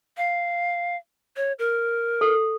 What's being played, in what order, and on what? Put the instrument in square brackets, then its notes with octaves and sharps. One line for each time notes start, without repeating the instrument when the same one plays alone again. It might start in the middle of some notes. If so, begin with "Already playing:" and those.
[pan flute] F5
C#5
A#4
[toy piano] A4